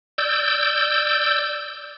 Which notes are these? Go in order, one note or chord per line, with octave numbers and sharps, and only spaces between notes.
D5 E6 G6